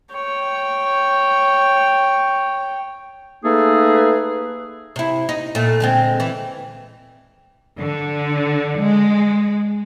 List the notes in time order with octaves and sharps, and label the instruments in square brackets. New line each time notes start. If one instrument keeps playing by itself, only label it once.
[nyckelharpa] C#5 G5
[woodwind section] A3 A#3 D#4 G#4 A4 B4
[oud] C3 E4
D#4
A#2 A3
D3 G#3 C4
E3
[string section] D3
G#3